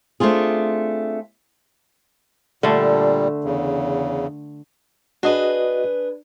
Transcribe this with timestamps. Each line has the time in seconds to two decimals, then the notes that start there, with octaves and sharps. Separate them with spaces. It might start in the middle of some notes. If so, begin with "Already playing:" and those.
0.20 A3 C4 D4 F4 G#4
2.63 A#2 D3 G3 A3
3.44 E2 C#3
5.23 D4 F#4 G#4 B4 D#5